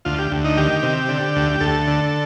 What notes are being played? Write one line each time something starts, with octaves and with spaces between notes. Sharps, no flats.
D2 F4
G4
D2
D#4
D#3 G4
C3
D3
D2
D2 A4
D3